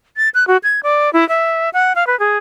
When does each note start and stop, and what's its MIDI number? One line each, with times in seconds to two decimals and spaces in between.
0.17 0.29 93
0.34 0.47 90
0.47 0.57 66
0.63 0.80 92
0.83 1.12 74
1.13 1.27 64
1.29 1.69 76
1.73 1.93 78
1.95 2.07 77
2.07 2.18 71
2.19 2.37 68